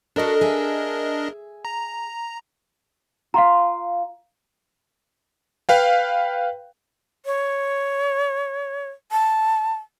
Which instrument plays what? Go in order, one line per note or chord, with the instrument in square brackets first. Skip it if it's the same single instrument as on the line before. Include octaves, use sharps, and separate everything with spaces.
[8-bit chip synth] D4 A#4 D#5 [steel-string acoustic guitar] F#4 A4
[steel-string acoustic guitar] G#4 E5
[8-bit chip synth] A#5
[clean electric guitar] F4 [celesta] F5 A#5
[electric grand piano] B4 F5 G5
[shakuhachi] C#5
A5